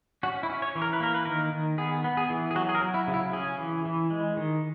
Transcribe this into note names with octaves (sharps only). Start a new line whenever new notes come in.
C#4 F#4
E4
C#4
C#5
E3
A#4
B4
A#3 A#4
B4
D#3 A#4
D#3
B3 G#4
B3
G#4
E3
G#4
F#3 F#4
G#4
A#4
F#3
E4
C#3
E4
C#4 G#4
E3
E3
G#3
D#3